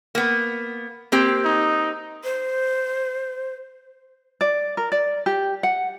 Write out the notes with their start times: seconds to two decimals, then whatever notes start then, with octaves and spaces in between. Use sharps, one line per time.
0.15 A#3 B3
1.12 A#3 C4 G4
1.45 D#4
2.24 C5
4.41 D5
4.77 A#4
4.92 D5
5.26 G4
5.63 F#5